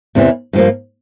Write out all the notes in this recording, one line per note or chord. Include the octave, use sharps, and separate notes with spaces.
E2 C3 E3
G2 F3 A#3